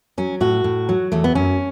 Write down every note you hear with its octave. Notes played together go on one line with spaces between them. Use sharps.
F#3 C#4
A2 F#4
A2
F#3
E2 A3
B3
F#2 C#4